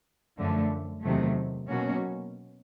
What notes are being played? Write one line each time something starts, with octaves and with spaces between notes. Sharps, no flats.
F#2 D3 F3 A3
E2 C3 D#3 F#3 A3
B2 F#3 A#3 C#4 F#4